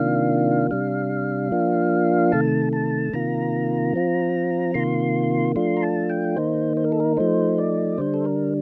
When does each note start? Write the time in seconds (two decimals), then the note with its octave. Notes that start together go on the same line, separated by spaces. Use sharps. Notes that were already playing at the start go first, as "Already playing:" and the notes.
Already playing: C3 D#3 A#3 D4 F4 F5
0.71 C3 G3 D4 F5
1.51 F3 A#3 D4 F4
2.32 C3 D#3 A3 A5
2.73 A5
3.14 C3 D#3 A#3 F4 A#5
3.94 F3 C4 F4
4.74 C3 D#3 A#3 F4 C6
5.56 F3 A3 D4 F4 C6
5.77 A#5
5.83 A5
6.10 G5
6.36 D#3 A#3 D#4 C5
6.77 C5
6.84 A#4
6.92 A4
7.00 A#4
7.17 F3 A3 D#4 C5
7.58 D5
7.98 D3 G3 D4 C5
8.14 A4
8.25 A#4